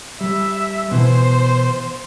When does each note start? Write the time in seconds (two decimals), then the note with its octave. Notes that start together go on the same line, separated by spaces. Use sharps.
0.21 G3 E5
0.91 B2 E3 C5